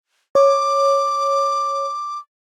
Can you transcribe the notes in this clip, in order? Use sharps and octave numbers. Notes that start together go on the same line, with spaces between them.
C#5 D6